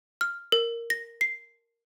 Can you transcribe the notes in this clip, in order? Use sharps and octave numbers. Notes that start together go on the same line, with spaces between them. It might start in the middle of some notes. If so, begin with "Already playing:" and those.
F6
A#4
A#6
C7